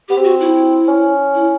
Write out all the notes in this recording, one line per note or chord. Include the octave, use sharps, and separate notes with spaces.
B3 G4
C4
F#4
E4
C#4
E4